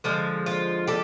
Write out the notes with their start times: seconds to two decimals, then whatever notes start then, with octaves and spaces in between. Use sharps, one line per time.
0.04 D3 F3 G#3
0.46 F4
0.87 G4 A4